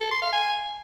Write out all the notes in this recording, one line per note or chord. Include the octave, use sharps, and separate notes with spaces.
A4
C6
F5
G#5